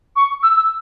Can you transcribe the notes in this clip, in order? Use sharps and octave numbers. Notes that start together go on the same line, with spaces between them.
C#6
E6
E6